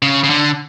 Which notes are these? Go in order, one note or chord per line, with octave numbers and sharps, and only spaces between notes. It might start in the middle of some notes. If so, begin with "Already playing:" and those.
C#3
C#3
D3